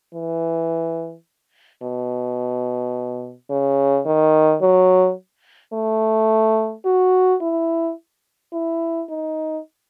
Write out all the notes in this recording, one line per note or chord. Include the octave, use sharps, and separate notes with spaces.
E3
B2
C#3
D#3
F#3
A3
F#4
E4
E4
D#4